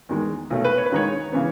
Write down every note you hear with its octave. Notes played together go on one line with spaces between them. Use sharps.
E2 D#3 G#3
B1 B2 A3
B4
C#5
B4
D#2 D#3 G#3 D#4 C#5
C#3 E3 B3